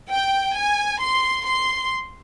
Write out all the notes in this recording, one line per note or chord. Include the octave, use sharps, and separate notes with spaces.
G5
G#5
C6
C6